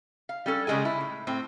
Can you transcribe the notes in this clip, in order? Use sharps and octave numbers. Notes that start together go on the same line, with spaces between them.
F5
G3 C#4 A4
C#3 G3 G#3 G#4 G#5
E4
A2
A2 C4